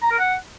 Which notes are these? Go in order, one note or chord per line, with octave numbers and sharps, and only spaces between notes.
A#5
A#4
F#5